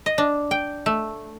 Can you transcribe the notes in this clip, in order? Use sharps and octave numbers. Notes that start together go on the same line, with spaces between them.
D#5
D4
G5
A3